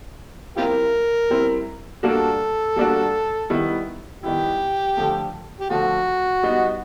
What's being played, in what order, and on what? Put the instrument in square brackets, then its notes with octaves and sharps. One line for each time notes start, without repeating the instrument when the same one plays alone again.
[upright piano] G3 C4 E4 [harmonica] F4 G4 A#4
[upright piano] G3 C4 E4
[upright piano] G3 A#3 D4 F#4 [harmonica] A4
[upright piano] G3 A#3 D4 F#4
D#3 G3 B3 E4
[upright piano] D#3 G3 B3 E4 [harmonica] G4
[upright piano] D3 F3 A3
[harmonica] G4
[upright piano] D3 F3 A3 [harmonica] F#4
[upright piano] G3 B3 D#4